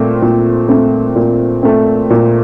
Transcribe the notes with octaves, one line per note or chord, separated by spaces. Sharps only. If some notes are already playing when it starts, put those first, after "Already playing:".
Already playing: A#2 A3 C4
A#2
A3 C4
A#2
A3 C4
A#2